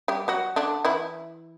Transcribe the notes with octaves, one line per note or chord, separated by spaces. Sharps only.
G3 G4
F#3 F#4
D3 D4
E3 E4